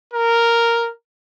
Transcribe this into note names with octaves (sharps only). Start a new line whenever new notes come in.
A#4